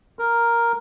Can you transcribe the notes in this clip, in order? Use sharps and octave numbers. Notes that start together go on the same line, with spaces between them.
A#4